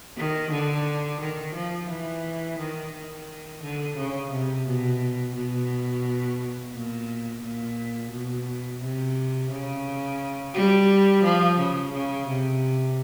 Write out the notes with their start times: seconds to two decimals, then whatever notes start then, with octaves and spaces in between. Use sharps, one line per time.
0.17 D#3
0.51 D3
1.20 D#3
1.55 F3
1.89 E3
2.59 D#3
2.93 D#3
3.62 D3
3.97 C#3
4.32 C3
4.67 B2
5.36 B2
6.73 A#2
7.43 A#2
8.12 B2
8.82 C3
9.51 C#3
10.54 G3
11.24 F3
11.58 C#3
11.93 C#3
12.28 C3